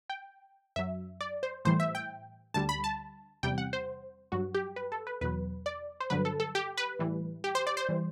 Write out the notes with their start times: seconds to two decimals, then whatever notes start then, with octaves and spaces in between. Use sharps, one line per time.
0.10 G5
0.76 F#2 F#3 E5
1.21 D5
1.43 C5
1.65 A2 E3 G3 C5
1.80 E5
1.95 G5
2.54 D2 D3 G3 A5
2.69 B5
2.84 A5
3.43 E2 C3 G3 G5
3.58 F#5
3.73 C5
4.32 G2 F#3 F#4
4.54 G4
4.76 B4
4.92 A4
5.07 B4
5.21 E2 B2 F#3 B4
5.66 D5
6.00 C5
6.10 G2 D3 F#3 B4
6.25 A4
6.40 A4
6.55 G4
6.77 B4
6.99 A2 E3 G3
7.44 G4
7.55 C5
7.67 D5
7.77 C5
7.89 E3 G3